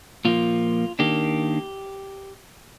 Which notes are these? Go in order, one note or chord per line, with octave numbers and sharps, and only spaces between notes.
A#2 F3 A#3 F4
D#3 A#3 D4 G4